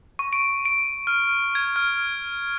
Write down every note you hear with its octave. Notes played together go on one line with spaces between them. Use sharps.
C#6
D7
D7
F6
G#6
F6